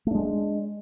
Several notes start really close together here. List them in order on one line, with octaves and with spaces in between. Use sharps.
A3 D4 G#3